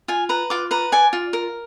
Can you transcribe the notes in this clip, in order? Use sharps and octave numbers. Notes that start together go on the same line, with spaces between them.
F4 G#5
B4 A#5
F4 D6
B4 A#5
D5 G#5
F4
A#4